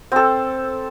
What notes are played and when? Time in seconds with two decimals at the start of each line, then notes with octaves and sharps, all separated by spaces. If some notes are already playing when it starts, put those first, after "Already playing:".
0.12 C4 A4